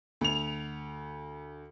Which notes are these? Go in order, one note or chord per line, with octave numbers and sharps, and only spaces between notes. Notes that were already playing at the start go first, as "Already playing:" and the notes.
D2 F7